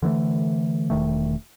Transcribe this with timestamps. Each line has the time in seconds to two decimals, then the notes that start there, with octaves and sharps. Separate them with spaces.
0.02 D3 E3 G#3 A3
0.90 E1 D#3 A3